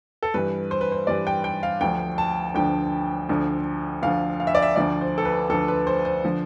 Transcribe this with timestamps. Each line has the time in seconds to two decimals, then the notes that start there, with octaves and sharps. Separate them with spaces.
0.23 A4
0.34 G2 E3 B4
0.71 C5
0.81 B4
0.92 C5
1.07 G2 E3 D5
1.27 G5
1.44 G5
1.63 F5
1.81 D2 D3 F3 G5
2.18 A5
2.54 D2 D3 F3 G5
3.29 D2 D3 F3
4.02 D2 D3 F3 F5
4.40 F5
4.47 E5
4.55 D5
4.62 E5
4.76 D2 D3 F3 D5
5.01 C5
5.18 A4
5.25 B4
5.50 D2 D3 F3 A4
5.68 B4
5.87 C5
6.05 C5
6.24 D3 F3